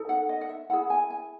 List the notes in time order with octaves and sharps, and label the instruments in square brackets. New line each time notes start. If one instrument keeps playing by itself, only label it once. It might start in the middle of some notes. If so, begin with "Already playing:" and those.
Already playing: [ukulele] D#4 A4
F#5
D#5
F#5
E5
E4 G#4 F#5
G#5
G#5